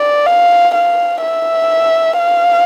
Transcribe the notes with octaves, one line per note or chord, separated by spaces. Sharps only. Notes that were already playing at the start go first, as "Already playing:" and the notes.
Already playing: D5
F5
F5
E5
F5